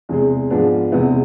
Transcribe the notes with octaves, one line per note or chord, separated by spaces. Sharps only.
E2 C3 G#3
G#2 F3 G#3 B3 D4
E2 C3 G#3 B3 E4